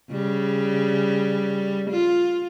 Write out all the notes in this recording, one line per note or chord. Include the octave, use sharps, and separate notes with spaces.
C#3 G3
F4